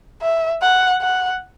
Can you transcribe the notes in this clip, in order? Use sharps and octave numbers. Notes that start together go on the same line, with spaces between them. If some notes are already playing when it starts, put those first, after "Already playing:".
E5
F#5
F#5